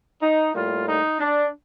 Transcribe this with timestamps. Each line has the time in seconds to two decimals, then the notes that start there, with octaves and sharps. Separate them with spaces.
0.22 D#4
0.54 A2 G3 A#3 F4
0.87 D#4
1.19 D4